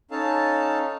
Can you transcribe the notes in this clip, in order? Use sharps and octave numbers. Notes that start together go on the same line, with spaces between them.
C#4 D#4 A4 F5 A5